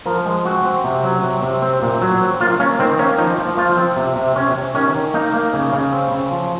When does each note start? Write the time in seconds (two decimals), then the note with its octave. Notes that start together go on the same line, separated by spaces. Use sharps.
0.06 F3 A#4
0.26 G#3
0.45 C4 F#4
0.65 C4
0.84 C3
1.03 F#3
1.23 C3
1.43 C3
1.62 C4
1.82 A#2
2.02 F#3
2.21 C4
2.40 A#3 F4
2.60 A#3 C#4
2.79 D#3 C4
2.99 A#3 C#4
3.18 F3 D#4
3.38 F3
3.57 F3 F4
3.77 C4
3.97 C3
4.16 C3
4.36 C3 C#4
4.55 C3
4.74 D#3 C#4
4.95 D#3
5.14 A#3 D#4
5.34 A#3
5.53 C#3
5.73 C#3
5.92 C4
6.12 C#3
6.31 F3